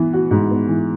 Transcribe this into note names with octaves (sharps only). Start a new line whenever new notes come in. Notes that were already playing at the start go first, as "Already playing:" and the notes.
Already playing: E3 B3
F#4
G#2
B3
E3